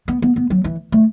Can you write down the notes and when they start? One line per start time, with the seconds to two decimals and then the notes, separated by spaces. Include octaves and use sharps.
0.08 B3
0.22 B3
0.36 B3
0.50 F#3
0.64 E3
0.92 A3